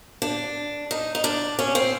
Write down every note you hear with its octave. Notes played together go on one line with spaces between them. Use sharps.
D4
D#4
D#4
D4
C#4
C4